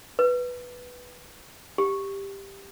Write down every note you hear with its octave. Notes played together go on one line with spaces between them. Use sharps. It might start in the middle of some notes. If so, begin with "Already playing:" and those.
B4
G4